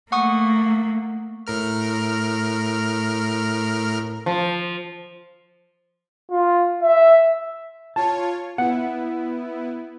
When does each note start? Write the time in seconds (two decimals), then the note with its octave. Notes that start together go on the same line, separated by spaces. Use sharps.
0.12 A3 A#3 F#5 C#6 D#6
1.47 A2 A#4 F6
4.26 F3
6.31 F4
6.83 E5
7.96 F4 C#5 A5
8.58 B3 E4 F#5